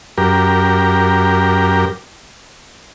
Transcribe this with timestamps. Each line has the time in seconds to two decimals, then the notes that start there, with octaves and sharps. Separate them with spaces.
0.18 F#2 G4 A#4